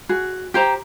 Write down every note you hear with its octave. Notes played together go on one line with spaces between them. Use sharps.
F#4 G#4
G4 C5 G5 A#5